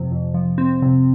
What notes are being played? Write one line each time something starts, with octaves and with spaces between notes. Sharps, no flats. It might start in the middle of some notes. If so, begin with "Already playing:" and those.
Already playing: F2 C3 F3
F2
F3
C4
C3